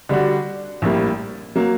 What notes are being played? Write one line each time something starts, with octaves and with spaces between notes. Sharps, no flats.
D3 G3 D4 F#4
A#1 A2 G3 A#3
F#3 A#3